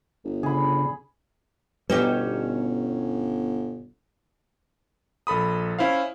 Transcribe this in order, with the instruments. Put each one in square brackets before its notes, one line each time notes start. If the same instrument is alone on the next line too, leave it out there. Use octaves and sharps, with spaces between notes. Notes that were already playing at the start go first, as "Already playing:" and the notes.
[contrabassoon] G1
[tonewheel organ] C#3 D4 [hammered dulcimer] G#4 B5
[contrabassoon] G1 [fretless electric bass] B2 G3 [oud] C#4 D#4 G4 [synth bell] B4
[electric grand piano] A#1 A4 B5 D#6
C#4 E4 C5 F5